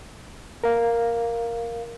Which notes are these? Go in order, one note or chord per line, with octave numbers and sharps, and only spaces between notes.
A#4 F5